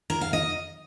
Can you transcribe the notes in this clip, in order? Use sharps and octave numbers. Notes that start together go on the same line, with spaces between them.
A#4
F5
D#5